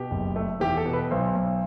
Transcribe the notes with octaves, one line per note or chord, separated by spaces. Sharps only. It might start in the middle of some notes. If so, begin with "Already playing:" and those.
Already playing: B2 G4
F#1
A3
E2 G4
A4
B2
B4
B1 C5
B1